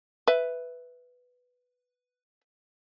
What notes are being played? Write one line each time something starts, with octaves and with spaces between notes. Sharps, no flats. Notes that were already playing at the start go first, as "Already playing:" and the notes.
B4 E5